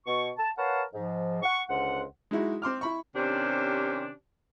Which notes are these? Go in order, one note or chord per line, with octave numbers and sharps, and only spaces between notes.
B2 C#6
A5
A#4 B4 C#5 F5 F#5 A5
G#2 F3
F#5 C#6
C#2 D3 C5 F#5
G#3 D#4 E4 F#4
C4 C6 D6 F6
E4 B5 C#6
C3 D#3 C#4 D4 G4 C5